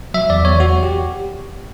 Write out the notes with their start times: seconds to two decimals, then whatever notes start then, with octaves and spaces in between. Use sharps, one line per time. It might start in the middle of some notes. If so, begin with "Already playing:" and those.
0.14 F#3 E5
0.30 E2 D5
0.45 E2 C#5
0.60 E2 F#4
0.83 G4